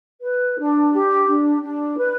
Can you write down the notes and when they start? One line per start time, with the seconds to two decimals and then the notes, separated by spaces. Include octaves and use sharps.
0.21 B4
0.57 D4
0.92 G4
1.27 D4
1.62 D4
1.97 B4